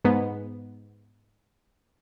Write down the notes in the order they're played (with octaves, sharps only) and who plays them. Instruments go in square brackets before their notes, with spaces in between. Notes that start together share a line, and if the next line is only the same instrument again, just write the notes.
[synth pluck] G#2 B3